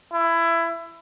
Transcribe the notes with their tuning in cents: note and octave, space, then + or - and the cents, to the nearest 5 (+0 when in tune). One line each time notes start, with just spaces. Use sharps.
E4 +20